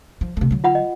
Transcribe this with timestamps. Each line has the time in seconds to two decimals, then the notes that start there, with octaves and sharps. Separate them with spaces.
0.21 F3
0.37 C3 A3
0.51 D3 F#3
0.64 F4 F#5 B5
0.75 D#5